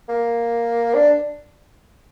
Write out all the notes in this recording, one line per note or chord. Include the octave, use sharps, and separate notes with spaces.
A#3
D4